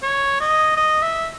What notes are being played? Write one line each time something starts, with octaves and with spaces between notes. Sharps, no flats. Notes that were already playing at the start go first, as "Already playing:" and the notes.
C#5
D#5
D#5
E5